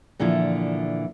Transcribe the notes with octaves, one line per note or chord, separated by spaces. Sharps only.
A#2 D3 E3 F3 E4